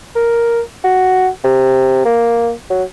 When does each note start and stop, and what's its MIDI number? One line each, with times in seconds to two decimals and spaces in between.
0.16 0.61 70
0.84 1.28 66
1.44 2.01 48
2.05 2.52 58
2.70 2.84 54